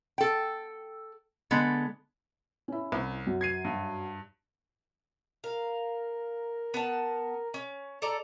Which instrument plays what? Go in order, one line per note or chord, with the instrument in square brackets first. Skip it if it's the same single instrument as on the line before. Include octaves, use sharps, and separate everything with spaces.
[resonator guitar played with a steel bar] A4 G5
D3 G#3 B3
[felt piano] C#4 E4
[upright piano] C2
[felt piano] F#2
[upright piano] G#6 C7 D#7
G2
[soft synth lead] A#4 [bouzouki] F5
[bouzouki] B3 F#5 A5
C#4
A4 D5 A#5